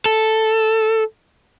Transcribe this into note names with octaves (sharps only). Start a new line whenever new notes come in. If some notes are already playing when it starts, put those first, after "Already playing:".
A4